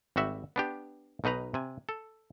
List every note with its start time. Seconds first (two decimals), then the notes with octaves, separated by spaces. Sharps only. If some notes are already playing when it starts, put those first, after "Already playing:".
0.16 G#1 G3 F#4 E5
0.56 B3 D4 G4
1.24 B1 B2 D#4 B4 A#5
1.54 C3 G#5
1.89 A4